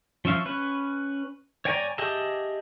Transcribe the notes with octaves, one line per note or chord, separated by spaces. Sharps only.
F3 C#4 E5 F5
C#4 B4
C#5 D5 G5 G#5 A#5
G4 G#4 D#5 E5 A5